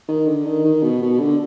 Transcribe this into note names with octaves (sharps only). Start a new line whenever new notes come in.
D#3
D3
D#3
D#3
B2
B2
D3